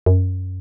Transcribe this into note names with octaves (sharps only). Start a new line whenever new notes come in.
F#2